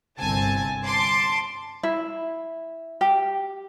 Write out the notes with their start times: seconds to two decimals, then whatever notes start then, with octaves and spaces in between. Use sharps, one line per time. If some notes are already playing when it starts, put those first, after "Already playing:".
0.20 G1 C2 C4 G#5 A5
0.86 A5 C6 D6
1.83 E4
3.01 G4